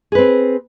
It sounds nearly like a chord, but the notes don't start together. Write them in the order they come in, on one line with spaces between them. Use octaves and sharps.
G#4 B4 C4